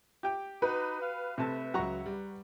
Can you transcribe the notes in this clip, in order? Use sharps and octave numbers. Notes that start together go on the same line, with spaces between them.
G4 G5
D#4 F#4 B4
F5
C3 A3 E5 A5
C#2 F#3 F#5 A#5 C#6
G3